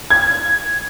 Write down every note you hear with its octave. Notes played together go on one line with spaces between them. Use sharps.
G#6